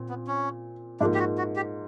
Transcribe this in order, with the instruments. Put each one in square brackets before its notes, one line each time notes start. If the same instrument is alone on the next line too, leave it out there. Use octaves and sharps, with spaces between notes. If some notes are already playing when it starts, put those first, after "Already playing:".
Already playing: [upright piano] A#2 C4
[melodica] B3
C#4
[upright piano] G#2 F3 A#3 [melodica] D4
[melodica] G4
F#4
F#4
G4